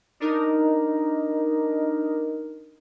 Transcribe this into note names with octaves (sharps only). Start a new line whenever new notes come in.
D4 D#4 A#4